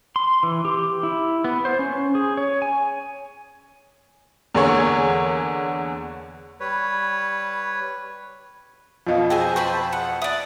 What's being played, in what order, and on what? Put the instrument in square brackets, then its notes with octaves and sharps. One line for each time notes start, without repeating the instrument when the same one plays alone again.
[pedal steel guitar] C6
E3
G4
E4
B3
C5
C#4
G#4
C#5
G#5
[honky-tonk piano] E2 D3 A#3 G#4 C#5 C#6
[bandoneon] G3 B4 C#5
[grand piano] F2 B2 [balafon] F4 D#5 F5
[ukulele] F#4 G#4 G5 [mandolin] C5 E5 G#5
[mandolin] C5 A5 B5 [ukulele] G5 [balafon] C#6
[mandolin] F#5
[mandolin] D5 D#6 [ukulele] E5